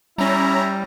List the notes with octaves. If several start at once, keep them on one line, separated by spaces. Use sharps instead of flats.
G3 C#4 E4 A#5